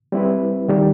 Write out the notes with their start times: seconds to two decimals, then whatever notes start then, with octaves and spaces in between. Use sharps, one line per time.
0.12 G3 C4 E4 B4
0.68 D#3 G3